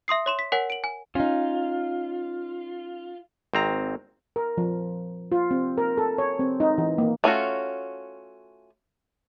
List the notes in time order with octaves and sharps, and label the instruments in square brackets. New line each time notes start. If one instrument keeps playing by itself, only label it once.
[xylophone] E5 C6 D#6 C7
C#5 C6 E7
B6
A#4 C#5 F#5 G#5 B6
D7 F#7
G#5
[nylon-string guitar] C#4 D#4 [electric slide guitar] F4
[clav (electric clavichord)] G#1 C4 A#5
[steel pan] A#4
F3
F4
C4
A#4
A4
C#5
C4
D#4
E3
A#3
[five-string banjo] A3 C#4 F4 F#4